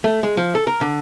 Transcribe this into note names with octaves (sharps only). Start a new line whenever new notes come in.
A3
G#3
F3
A4
A#4
D3